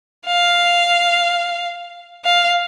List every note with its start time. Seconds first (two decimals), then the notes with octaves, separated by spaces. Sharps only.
0.26 F5
2.24 F5